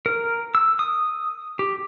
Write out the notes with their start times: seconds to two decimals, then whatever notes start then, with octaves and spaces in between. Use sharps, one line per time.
0.06 A#4
0.55 E6
0.79 D#6
1.59 G4